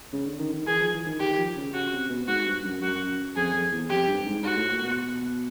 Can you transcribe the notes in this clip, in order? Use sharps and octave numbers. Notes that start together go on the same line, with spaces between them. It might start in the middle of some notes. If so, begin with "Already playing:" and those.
C#3
D3
D#3
D#3
E3 G#4
F3
E3
D#3
D#3 G4
F3
C#3
C#3 F#4
C3
B2
G#2 F#4
G2
F#2
F#2 F#4
F2 G#4
F2
E2
F2 G4
G2
G#2
G#2 F#4
A2
A#2
B2